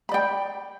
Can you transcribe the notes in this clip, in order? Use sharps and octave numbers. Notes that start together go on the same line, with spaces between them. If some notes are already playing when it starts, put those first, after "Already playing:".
D5 G5 B5